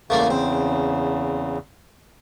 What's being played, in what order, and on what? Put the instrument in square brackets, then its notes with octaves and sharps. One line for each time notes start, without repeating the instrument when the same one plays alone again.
[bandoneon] E2 C#3 [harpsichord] A3 A#3 D5
[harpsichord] C4